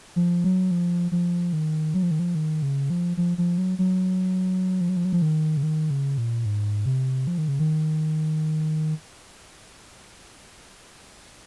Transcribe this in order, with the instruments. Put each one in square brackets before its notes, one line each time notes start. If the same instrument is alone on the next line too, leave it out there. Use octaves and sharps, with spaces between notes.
[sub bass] F3
F#3
F3
F3
D#3
F#3
F3
D#3
F3
D#3
C#3
F3
F3
F3
F#3
F#3
F3
F#3
F3
F#3
F3
D#3
C#3
D#3
C#3
A#2
G#2
C3
F3
D#3
C#3
D#3